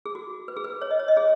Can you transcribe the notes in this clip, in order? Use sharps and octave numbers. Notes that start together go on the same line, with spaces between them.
G#4
F#4
B4
G#4
B4
C#5
D#5
C#5
D#5
G#4 C#5